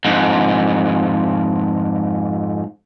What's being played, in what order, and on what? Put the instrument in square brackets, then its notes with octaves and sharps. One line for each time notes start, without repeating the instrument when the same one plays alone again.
[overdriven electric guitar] F2 G#2